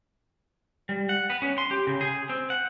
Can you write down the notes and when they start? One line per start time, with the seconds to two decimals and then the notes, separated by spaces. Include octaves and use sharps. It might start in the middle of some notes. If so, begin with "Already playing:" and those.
0.89 G3
1.09 F#5
1.30 B3
1.42 C#4
1.58 C6
1.71 G4
1.87 C#3
2.01 G#4
2.29 C4
2.50 F#5